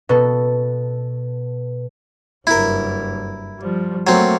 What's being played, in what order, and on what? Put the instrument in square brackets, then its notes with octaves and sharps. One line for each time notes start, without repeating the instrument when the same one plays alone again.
[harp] B2 B3 A4
[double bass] F#1 G2 [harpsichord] E4 A#4
[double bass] F3 G3
[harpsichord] F#3 C4 [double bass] A3 A#3